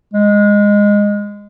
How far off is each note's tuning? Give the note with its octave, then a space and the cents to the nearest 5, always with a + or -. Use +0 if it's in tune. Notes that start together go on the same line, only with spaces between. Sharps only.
G#3 -15